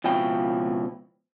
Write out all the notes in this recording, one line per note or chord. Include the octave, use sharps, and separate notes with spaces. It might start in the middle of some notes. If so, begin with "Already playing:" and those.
C#2 B2 F3 E4 G5